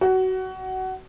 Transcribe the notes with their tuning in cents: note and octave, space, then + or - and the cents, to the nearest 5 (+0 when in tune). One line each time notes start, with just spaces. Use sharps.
F#4 +20